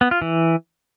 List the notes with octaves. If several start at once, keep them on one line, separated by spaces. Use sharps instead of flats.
B3
F4
E3